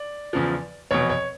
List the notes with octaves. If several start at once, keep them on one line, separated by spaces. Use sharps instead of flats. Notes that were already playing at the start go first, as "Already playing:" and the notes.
Already playing: D5
E2 C#3 F3
F1 E2 B2 C#5
C#5